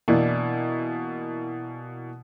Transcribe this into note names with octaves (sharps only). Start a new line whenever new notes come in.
B2 E3 A#3 D4 E4